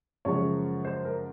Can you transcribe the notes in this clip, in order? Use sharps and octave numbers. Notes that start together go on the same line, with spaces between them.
F#2 C#3 F3 G#3 C#4 C#5
C5
A#4